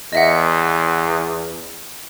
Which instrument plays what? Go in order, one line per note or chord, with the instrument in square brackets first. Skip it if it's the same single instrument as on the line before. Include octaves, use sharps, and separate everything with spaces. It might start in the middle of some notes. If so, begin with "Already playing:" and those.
[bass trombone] E2 [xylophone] D#5 E5 F#5